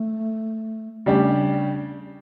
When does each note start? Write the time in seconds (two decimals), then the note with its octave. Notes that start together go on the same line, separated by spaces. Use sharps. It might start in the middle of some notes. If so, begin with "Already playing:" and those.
Already playing: A3
1.06 C#3 G3 A3 D4 G4